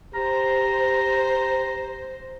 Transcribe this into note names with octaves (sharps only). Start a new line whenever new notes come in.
G4 C5 A#5